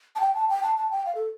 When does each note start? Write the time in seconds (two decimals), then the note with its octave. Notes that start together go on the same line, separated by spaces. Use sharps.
0.15 A5
0.20 G5
0.34 A5
0.49 G5
0.63 A5
0.76 A5
0.91 G5
1.06 F5
1.15 A4